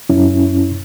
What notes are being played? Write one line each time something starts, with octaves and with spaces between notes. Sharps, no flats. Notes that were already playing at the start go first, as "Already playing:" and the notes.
F#2 C#4 E4